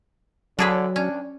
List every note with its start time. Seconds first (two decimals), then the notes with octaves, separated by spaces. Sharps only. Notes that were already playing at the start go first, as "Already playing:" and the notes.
0.59 D3 F#3 D4 G#4 B4
0.96 C#4 D4